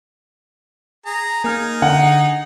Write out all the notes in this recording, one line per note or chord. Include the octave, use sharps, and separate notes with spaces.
G#4 A#5
A#3 D#4 G#4 F6 G#6
D3 F#5